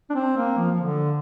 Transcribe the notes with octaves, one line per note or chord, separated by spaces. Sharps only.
D4
C4
A#3
F3
F3
D3